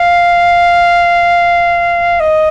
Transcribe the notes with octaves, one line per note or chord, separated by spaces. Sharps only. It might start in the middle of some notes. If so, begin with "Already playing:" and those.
Already playing: F5
D#5